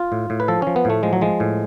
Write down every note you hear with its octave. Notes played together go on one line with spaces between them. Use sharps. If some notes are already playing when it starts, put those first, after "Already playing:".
Already playing: F4
A2
A2
B4
F3 A4
F3 C#4
B3
A2 A3
F3 G#3
F#3
F3 G#3
A2